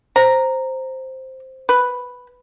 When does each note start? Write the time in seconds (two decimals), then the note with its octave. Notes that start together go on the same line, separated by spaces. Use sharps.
0.16 C5 A#5
1.69 B4